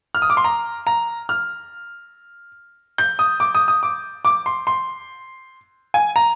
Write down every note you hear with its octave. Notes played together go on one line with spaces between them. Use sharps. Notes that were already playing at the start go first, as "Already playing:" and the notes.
F6
D#6
D6
C6
A#5
A#5
F6
G6
D#6
D6
D#6
D#6
D6
D6
C6
C6
G#5
A#5